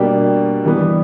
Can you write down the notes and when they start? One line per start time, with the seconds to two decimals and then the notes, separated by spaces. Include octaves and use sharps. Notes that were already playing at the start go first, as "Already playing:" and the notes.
Already playing: B2 G3 A#3 D4 G4
0.65 E3 G3 B3